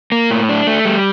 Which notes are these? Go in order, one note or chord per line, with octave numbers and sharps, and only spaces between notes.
A#3
A2
D4
A3
G3